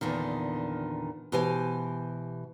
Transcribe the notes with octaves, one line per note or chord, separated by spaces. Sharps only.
E2 A#2 D3 D#3
B2 E3 G4 C5 G#5